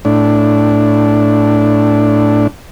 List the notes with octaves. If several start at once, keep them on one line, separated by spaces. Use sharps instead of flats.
A2 D4